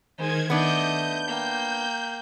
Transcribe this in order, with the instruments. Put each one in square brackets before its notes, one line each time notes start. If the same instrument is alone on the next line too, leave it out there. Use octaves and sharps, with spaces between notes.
[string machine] D#3 G#6 [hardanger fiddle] G#3 C5
[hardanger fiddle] A3 D#5 [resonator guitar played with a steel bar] B3 D4 [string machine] G6
[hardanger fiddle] A#3 G5